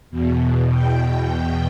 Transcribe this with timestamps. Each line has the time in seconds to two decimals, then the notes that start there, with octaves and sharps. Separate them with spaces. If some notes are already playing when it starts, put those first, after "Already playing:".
0.10 E2 B2
0.71 G5
1.00 G5
1.29 G5